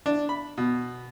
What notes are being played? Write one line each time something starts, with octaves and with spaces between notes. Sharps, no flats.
D4
B5
B2